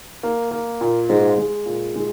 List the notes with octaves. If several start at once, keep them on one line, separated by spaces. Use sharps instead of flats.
A#3
A#3
A#2
G#2 G#3
G#3
A#2
G#3